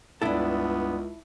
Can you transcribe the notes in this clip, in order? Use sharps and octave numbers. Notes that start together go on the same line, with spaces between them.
C#2 G2 B3 D4 E4 A4